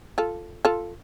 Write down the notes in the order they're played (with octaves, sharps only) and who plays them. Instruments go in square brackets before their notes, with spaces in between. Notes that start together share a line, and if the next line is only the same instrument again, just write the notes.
[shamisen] F4 A4
F4 A4